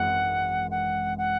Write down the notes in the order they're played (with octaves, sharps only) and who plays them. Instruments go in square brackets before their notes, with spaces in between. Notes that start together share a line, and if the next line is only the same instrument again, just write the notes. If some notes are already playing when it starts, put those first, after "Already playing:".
Already playing: [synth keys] G#1 F#2 E3 G#3 [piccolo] F#5
[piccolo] F#5
F#5